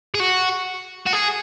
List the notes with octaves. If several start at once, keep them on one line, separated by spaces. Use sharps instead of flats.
G#4
F#4
F#4
G#4